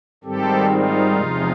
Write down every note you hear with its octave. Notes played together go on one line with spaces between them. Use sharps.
G#2 D#3 G3 C4 G4 A4
D#4 F4
E2 C3 F3 G#3